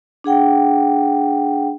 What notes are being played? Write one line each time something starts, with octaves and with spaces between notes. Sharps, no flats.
D4 G#4 F#5 G5